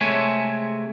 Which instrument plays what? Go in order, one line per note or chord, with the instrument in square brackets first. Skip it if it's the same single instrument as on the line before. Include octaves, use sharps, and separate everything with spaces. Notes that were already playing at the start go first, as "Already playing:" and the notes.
[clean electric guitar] C3 G#3 A3 C#5 E5 G#5